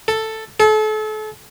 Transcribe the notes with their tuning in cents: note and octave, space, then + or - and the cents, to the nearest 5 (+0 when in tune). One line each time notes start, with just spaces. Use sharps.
A4 +5
A4 -35